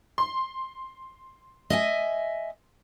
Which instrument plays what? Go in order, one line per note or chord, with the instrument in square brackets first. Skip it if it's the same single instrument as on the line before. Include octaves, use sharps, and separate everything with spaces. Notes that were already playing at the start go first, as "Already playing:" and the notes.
[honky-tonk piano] C6
[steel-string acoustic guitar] D#5 E5 G#5